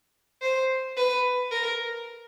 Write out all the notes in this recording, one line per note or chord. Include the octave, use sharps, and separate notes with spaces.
C5
B4
A#4